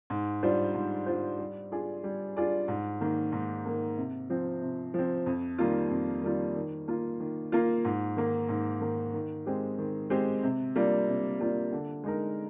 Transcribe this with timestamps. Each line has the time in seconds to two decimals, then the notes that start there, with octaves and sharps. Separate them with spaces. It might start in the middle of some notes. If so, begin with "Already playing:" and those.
0.10 G#2
0.43 G3 D4 F4 C5
0.74 G#2
1.06 G3 D4 F4 C5
1.39 G3
1.72 D4 F4 G#4 D5
2.04 G3
2.37 D4 F4 G#4 D5
2.68 G#2
3.01 D#3 A#3
3.32 G#2
3.66 D#3 A#3
3.97 C3
4.30 F3 C4
4.62 C3
4.94 F3 C4
5.26 F2
5.58 D#3 G3 A#3 F4
5.91 F2
6.23 D#3 G3 A#3 F4
6.56 D#3
6.88 A#3 F4
7.20 D#3
7.52 A#3 F4
7.85 G#2
8.17 D#3 A#3
8.49 G#2
8.81 D#3 A#3
9.14 D#3
9.46 G#3 C4 G4
9.78 D#3
10.10 G#3 C4 G4
10.43 C3
10.76 G3 A#3 D4 F4
11.08 C3
11.40 G3 A#3 D4 F4
11.72 D3
12.04 G#3 D#4 A#4